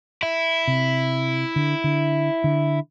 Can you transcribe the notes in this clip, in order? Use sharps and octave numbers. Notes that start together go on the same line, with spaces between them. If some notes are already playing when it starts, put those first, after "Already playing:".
E4
C3
D3
D3
D3